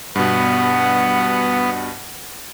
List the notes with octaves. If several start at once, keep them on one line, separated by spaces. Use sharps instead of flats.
G2 B2 B3 F#5